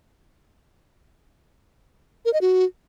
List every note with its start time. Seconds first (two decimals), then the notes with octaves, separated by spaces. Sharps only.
2.25 A#4
2.33 D#5
2.41 F#4